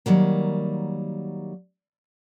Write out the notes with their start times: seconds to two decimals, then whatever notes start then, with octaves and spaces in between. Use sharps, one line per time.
0.06 D#3 F#3 G3 A#3